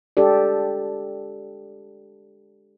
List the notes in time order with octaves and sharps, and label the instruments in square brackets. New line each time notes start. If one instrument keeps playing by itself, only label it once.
[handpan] G#3 D4 G4 A4 D5